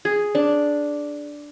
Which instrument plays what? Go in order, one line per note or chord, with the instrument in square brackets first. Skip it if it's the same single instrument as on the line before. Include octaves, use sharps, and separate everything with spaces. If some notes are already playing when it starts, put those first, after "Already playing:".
[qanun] G#4
D4